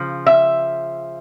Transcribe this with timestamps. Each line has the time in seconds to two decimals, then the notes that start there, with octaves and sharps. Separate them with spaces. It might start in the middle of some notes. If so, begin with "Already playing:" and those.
Already playing: C#3 F3
0.26 E5